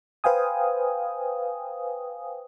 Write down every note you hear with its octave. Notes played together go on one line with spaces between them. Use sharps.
B4 C5 F5 G5 G#5 D#6